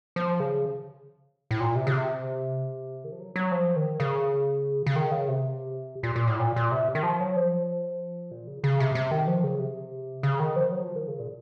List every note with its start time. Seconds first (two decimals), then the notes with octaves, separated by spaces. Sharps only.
0.16 F3
0.40 C#3
1.51 A2
1.60 A#2
1.76 C3
1.87 C#3
1.92 C3
3.04 D#3
3.12 F3
3.20 F#3
3.36 F#3
3.52 F3
3.76 D#3
4.00 C#3
4.86 C#3
4.96 D#3
5.12 C#3
5.28 C3
6.03 A#2
6.16 A#2
6.27 A2
6.39 A#2
6.56 A#2
6.71 C3
6.95 D#3
7.03 F3
7.20 F#3
7.36 F3
8.31 A#2
8.47 C#3
8.64 C#3
8.80 C3
8.95 C3
9.11 D#3
9.27 F3
9.44 C#3
9.59 C3
10.23 C#3
10.40 D#3
10.56 F3
10.72 F#3
10.84 F3
10.96 D#3
11.08 C#3
11.20 A#2